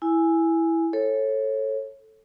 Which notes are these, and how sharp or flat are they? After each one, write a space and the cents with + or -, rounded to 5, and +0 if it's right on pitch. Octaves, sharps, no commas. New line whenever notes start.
E4 +0 G#5 +0
A4 +0 C#5 -20